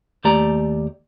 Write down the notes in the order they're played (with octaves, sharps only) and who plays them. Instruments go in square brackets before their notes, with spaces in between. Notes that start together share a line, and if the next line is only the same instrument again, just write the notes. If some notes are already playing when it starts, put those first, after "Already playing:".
[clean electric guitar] D#2 A3 G4 D5 A#5